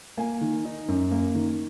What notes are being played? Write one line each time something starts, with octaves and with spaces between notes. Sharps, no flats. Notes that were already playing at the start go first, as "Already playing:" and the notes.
A#3 G#5
D#3
D#4
F#2
A#3
D#3